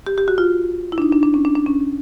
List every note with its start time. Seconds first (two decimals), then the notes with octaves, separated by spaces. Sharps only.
0.07 G4
0.18 G4
0.28 F#4
0.38 F4
0.92 E4
0.98 D4
1.02 D#4
1.12 D4
1.23 D4
1.34 C#4
1.45 D4
1.55 D4
1.66 C#4